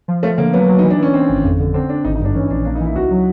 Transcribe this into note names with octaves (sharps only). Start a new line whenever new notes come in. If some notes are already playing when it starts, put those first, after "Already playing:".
F3
F3 A3
D3 A#3
F#3 B3
F#3
E3 D#4
D4
E3 C#4
E3 C4
G#1
F2
D3
D3 C4
D3 D4
G#1 D#4
D#4
G2 D4
E3 C#4
A#1 D4
A#3 D4
D#4
E3
E4
C#2 F#4
F#3